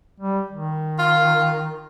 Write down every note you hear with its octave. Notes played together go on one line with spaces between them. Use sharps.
G3
D#3
F4